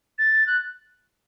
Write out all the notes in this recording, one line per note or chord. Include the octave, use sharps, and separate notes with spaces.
A6
F#6